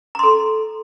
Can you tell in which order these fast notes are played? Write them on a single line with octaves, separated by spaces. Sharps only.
A#5 C6 A4